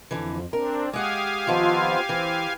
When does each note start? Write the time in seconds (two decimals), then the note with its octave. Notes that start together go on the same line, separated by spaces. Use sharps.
0.11 F2 D3 E3
0.53 C4 D4 A#4
0.93 G#3 G4 F5 F#5 G#5 D6 D#6
1.47 D#3 F3 B3 C4 F4
2.09 E3 C4